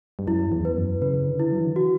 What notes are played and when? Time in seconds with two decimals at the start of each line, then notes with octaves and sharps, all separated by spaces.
0.19 G2
0.27 F#2 E4
0.52 E2
0.65 B4
0.77 F#2
1.02 C#3 B4
1.27 D3
1.39 E4
1.52 F#3
1.59 E3
1.66 D3
1.73 E3 F#4